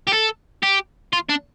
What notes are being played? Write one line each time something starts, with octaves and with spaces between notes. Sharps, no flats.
G4
A4
G4
F4
D4